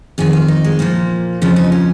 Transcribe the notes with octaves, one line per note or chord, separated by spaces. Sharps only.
F2 D#3 G#4
F4
D#4
G#3
A#2 F3 A#3
F2 C#3 F3 C#4
D#4
C#4